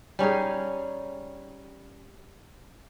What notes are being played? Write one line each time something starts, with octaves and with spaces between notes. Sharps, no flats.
G3 C#4 D#4 G#4